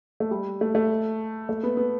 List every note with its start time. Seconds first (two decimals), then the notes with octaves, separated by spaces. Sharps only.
0.20 A3
0.31 G3
0.61 A3
0.75 A3
1.49 A3
1.63 B3
1.77 B3